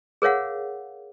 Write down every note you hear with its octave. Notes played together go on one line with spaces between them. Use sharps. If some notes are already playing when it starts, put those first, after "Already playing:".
G#4 A#4 C#5 F5 F#5